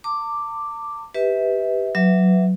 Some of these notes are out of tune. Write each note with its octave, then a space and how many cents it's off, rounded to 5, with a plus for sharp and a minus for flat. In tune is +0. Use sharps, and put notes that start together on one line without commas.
A5 +40 D6 +0
G4 +0 B4 +0 E5 -30
F#3 +0 B4 +15 E5 +0